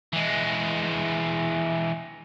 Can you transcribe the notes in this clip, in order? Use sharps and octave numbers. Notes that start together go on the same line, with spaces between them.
E3 G#3